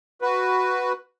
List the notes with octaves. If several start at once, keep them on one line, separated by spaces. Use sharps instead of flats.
F#4 B4